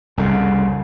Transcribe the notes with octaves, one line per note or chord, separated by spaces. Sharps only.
C2 F2 C#3